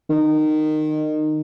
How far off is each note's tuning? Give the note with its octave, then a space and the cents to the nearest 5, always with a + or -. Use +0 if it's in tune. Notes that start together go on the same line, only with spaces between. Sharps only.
D#3 -20